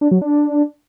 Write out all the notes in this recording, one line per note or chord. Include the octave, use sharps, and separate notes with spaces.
D4
F#3
D4